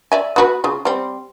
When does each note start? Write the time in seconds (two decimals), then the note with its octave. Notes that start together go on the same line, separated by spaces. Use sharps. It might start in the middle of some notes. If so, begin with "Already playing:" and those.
0.12 D5 E5 G#5
0.36 B3 F#4 B4
0.64 C#3 F4
0.85 G3 C4